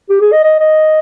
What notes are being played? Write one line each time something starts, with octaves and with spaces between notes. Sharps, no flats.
G4
G#4
D#5
D#5
D#5